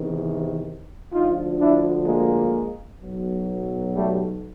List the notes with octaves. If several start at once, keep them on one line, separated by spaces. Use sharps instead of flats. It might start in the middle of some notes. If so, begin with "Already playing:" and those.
Already playing: E2 C3 D#3
D2 D3 F3 D#4 F4
D4 E4
G#3 A#3
B1 B2 F#3
G3 A3